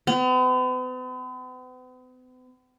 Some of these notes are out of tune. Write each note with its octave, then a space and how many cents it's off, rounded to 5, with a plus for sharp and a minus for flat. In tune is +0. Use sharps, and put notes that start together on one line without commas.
B3 +45